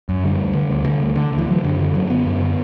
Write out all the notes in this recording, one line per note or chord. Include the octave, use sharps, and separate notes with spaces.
F#2
D3 G3
D2
D3
D2
D3
D2
D3
D2
E3
D3 F#3
F#2 D3
D3
F#2 F#3
D3 B3
F#2
D3